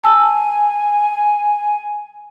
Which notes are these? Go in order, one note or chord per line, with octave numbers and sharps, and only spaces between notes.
G#5 A5 E6